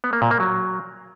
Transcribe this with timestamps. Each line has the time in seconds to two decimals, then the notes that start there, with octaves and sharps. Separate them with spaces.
0.04 B3
0.13 A#3
0.22 A#2
0.31 A#3
0.40 F#3